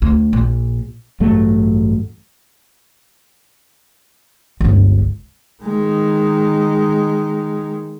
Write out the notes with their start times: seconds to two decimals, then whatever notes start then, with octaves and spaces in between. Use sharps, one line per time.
0.02 D2
0.33 A#1
1.20 A1 G2 F#3 A3
4.60 G1 C#2
5.63 D#3 G#3